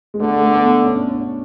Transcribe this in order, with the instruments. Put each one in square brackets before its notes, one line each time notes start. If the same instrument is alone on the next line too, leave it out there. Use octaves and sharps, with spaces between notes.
[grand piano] G#3
[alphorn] D3 [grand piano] A3
[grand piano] A3
B3
C#4
D4
C#4